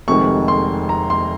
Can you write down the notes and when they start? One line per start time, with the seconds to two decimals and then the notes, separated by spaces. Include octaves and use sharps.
0.08 F1 F2 C3 D#3 G#3 C#6
0.48 C6
0.89 A#5
1.10 C6